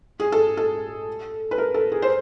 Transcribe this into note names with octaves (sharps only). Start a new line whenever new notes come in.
G#4
A4
A4
B4
A#4
A4
G#4
C5